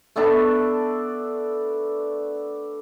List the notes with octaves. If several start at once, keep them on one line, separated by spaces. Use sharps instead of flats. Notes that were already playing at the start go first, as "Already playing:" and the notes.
A3 B3 D4 A4